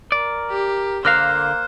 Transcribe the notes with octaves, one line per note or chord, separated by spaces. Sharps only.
A#4 D5
G4
D3 A#3 A#4 C5 F5 F6 F#6